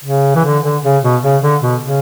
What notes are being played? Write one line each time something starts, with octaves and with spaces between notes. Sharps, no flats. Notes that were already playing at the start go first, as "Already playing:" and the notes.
C#3
E3
D3
D3
C#3
B2
C#3
D3
B2
C#3